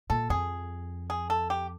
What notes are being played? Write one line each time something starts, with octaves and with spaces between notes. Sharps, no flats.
A#2 A4
F2 G#4
G#4
A4
G4